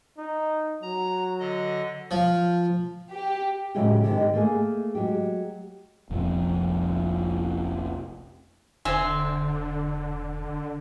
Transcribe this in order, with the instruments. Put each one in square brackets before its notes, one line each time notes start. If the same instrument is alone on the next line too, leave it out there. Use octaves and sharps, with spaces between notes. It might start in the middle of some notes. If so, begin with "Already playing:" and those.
[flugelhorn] D#4
[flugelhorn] F#3 [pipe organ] A#5
[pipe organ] D3 D#5
[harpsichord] F3
[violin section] G4
[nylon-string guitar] A2 C#3 F#3 G#3 A3 G4
G#2 D3 D#3 G4
A3 A#3 G#4
F#3 G#3 G4
[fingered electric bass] F1 A#1 F2
[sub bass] E1 [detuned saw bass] D3 [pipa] C4 E5 G#5